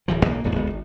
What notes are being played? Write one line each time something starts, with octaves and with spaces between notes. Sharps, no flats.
D1 E3 F3
B1 A#3
D#1 E2 G#2 B3
F#1 D2 G#3 B3
G#1